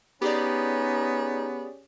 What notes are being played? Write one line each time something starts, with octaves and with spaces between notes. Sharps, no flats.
B3 C#4 D#4 G4 G#4 D5